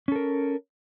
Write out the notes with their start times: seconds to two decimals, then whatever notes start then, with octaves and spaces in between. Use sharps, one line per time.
0.08 C#4
0.12 A4
0.16 A#4